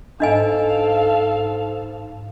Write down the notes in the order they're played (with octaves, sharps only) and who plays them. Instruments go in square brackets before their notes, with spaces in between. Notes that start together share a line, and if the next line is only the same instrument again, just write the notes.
[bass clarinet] G#2 [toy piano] D4 D#5 G#5 [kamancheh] A4 F5